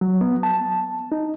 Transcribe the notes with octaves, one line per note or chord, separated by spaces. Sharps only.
F#3
B3
A5
D#4